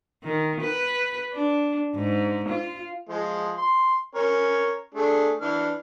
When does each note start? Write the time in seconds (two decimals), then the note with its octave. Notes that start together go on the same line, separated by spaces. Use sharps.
0.23 D#3
0.60 B4
1.33 D4
1.96 G#2
2.48 F4
3.09 F3 G#3
3.58 C6
4.15 C#4 A#4 C#5
4.94 A3 D4 G#4
5.41 E3 D4 F6